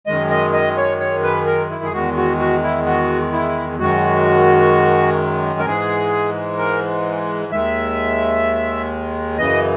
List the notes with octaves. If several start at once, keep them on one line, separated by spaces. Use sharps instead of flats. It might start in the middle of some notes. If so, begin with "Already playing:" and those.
F#2 D#3 G#3 D#5
D#5
D#5
C#5
C#5
B4
A#4
E4
G#4
E2 D#3 G#3 F#4
F#4
F#4
E4
F#4
E4
F#2 D#3 G#3 F#4
A#4
G#2 E3 G#3 G#4
A#4
D#2 D#3 G#3 E5
F#2 C#3 E3 D#5